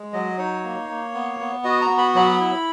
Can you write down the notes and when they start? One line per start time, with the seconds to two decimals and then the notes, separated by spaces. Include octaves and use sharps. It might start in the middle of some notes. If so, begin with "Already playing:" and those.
Already playing: G#3
0.13 F#3 D#5
0.38 D#4 C#5
0.64 A#3
0.89 A#3
1.14 B3
1.40 B3
1.64 F#4 D#5
1.82 A#5
1.90 B3
1.98 B5
2.15 F#3 B5
2.40 E4